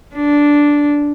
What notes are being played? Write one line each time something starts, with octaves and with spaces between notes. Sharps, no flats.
D4